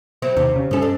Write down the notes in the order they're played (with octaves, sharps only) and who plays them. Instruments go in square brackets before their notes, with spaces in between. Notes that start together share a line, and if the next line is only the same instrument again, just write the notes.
[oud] F#3 C4 E4
[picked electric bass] D#2 [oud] C3
[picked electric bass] C#3
[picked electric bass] G2 C#4 [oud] F3 A4
[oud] D4